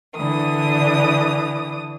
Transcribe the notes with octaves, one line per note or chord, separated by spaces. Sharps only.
D3 E3 D#6